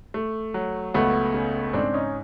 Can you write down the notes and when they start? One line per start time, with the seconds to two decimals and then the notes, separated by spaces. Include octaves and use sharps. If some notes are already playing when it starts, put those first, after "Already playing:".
0.14 A3
0.54 F#3
0.94 C#2 A3 B3
1.34 C#3
1.73 G#2 C4 D4
1.94 C#4 D#4